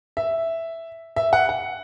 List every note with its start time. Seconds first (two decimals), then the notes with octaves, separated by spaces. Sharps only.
0.17 E5
1.16 E5
1.33 F#5
1.49 F#5